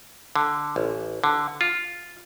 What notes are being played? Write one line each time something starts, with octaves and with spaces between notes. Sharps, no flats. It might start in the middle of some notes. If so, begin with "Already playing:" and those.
D3
A1
D3
F4